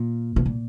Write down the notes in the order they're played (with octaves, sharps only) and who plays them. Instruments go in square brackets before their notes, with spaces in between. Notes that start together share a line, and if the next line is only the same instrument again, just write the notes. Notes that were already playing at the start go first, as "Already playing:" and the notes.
Already playing: [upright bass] A#2
B2
A#2